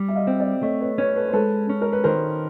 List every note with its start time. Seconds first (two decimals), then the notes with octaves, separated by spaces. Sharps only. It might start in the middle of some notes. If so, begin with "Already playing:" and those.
Already playing: G3
0.08 E5
0.15 D#5 F5
0.27 C4
0.39 D5 E5
0.63 A3 C#5 D#5
0.81 B4 C#5
0.98 C#4 B4 C#5
1.16 A4 B4
1.28 C5
1.33 G#3 A4 B4
1.69 C#4
1.82 A#4
1.93 B4
2.04 D#3 A#4 C5